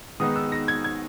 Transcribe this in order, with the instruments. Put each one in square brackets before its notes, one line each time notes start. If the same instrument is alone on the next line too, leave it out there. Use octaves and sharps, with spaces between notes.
[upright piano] D#3 G#3 B3 D#4 D#6
E6
A#6
G#6
G#6